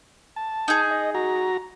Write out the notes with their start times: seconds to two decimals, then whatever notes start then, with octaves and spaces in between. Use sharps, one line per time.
0.36 A5
0.68 D#4 G#4
0.91 D#5
1.15 F#4 A#5